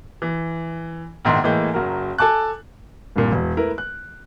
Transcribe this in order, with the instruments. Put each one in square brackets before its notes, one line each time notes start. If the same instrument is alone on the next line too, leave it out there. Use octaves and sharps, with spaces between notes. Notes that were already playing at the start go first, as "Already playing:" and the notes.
[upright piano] E3
A#1 E2 G#2 D#3 C6
A2 E3 G#3 A#3 G6
F#1 F#3 A#4
A4 G#5 A5 D6 F#6
[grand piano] C2 G2 A#2
E1
A3 E4 A#4 B4
F#6